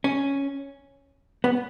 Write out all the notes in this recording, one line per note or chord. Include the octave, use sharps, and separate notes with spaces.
C#4
B3